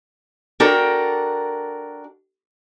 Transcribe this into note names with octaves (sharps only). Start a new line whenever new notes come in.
D4 F#4 A4 A#4 G5